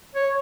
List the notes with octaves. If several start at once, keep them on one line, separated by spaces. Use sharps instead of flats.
C#5